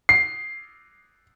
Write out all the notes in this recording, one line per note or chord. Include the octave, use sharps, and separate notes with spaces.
C7